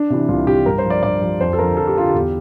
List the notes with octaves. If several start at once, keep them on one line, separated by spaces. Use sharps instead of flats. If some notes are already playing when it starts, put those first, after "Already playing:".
Already playing: D4
C3 E3
C2 F4
C3 E3 G4
G2 A#4
C5
F3
D5
G2 D5
F3
F2 C5
A4
D3 F3 A#4
F2 A4
G4
D3 F3 F4
G4
E2